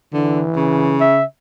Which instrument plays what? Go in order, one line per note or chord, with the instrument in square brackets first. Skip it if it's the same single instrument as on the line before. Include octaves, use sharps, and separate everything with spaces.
[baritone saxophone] D3 [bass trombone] E3
[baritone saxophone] C#3
[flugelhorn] E5